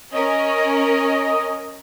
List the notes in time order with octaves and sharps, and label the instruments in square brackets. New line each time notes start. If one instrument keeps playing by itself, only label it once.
[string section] C#4 A#4 [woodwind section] D#5